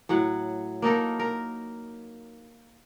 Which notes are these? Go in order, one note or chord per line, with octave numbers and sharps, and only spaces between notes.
A2 F#3 F#5
A#3 D#4 A4 A#4
A#4